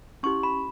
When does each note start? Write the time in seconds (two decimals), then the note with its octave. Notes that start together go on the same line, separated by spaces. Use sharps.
0.23 C#4 E4 G4 C#6
0.43 B5